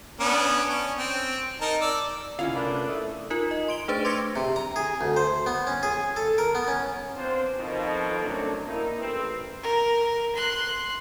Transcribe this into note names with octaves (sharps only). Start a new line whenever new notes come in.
B3 C#4 D4
C#4
C4
D#4 A#4 A5
D5 E6
C2 C#4 E4 F4 F5 F#5
A3 A#3 D4 B4 D5
A3 D#6
D#4 F4 A#4
D#5
C6 D7 G7
A3 D4 G#4 B4 C5 A6
C6 D6 E6 G#6 A#6 C#7
C3
A#5
G#4
D2
C5
B3
C#4
G#4
A4
A#4
B3
C#4
B3 C4 D4 F4 C5
F2 B2 D#3 F3
F#2 A2 D#3 F#3 C4 D4
A#3 D#4 E4
A1 C4 A#4 B4
A#4
C6 F#6